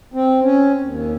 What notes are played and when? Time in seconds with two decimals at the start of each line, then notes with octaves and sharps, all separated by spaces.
0.14 C4
0.44 C#4
0.81 D#2